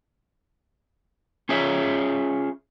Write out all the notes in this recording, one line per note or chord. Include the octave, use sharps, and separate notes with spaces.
C#4 F4 G#4 C#5 E5